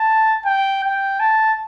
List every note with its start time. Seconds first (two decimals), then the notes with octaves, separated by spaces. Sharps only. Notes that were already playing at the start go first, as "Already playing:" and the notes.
Already playing: A5
0.45 G5
0.84 G5
1.20 A5